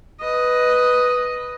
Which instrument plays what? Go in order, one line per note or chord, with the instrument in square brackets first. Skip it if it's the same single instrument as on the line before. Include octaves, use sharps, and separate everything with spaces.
[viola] B4 D#5